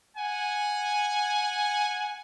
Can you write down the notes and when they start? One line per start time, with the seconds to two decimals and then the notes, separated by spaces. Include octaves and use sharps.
0.17 F#5 G#5